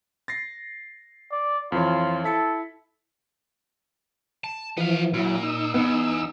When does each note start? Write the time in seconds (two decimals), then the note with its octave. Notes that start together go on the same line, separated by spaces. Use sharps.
0.28 A6 A#6 C7
1.32 D5
1.72 F2 E3 F4 C#5
2.24 E4 A4 B6 C#7
4.44 A5
4.77 E3 F3 B3 F5
5.14 A#2 F#3 E4
5.43 D#4 E6
5.74 E2 B3